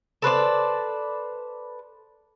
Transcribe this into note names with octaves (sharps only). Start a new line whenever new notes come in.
A4 B4 C5 D5